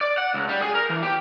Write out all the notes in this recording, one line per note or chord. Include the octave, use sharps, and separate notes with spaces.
D5
F#5
C#2
G3
G#4
A#4
E3
G4